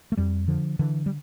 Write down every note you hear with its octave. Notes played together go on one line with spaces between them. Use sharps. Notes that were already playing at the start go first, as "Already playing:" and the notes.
A3
F2 G3
D3 F3
D3 E3
G3